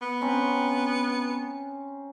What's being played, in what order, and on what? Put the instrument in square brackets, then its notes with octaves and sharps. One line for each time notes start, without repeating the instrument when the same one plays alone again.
[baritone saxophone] B3
[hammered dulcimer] C4 C#4 A#5